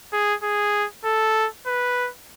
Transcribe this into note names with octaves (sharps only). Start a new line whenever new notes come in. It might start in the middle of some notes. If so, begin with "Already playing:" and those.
G#4
G#4
A4
B4